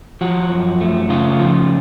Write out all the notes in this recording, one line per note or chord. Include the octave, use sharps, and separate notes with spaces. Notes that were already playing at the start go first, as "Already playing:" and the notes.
F3 F#4
F#2
A3
C#3 F4
F3